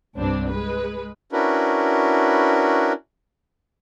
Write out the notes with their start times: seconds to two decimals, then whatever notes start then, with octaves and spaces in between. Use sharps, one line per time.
0.16 C2 G2 C4 D4
0.50 G#3 B4
1.32 C#4 D4 E4 F#4 A#4 B4